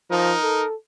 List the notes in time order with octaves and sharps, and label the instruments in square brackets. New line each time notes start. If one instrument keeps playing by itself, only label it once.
[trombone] F3 [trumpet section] D#4 A#4
[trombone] A4